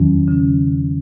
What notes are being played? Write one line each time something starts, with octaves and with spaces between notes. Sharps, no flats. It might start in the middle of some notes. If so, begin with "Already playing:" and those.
Already playing: E2 D#3 F#3 C#4
C#3 F#3 C#4